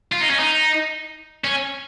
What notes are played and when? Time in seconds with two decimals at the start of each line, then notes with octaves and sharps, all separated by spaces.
0.12 F4
0.20 D#4
0.30 C#4
0.39 D#4
1.44 C#4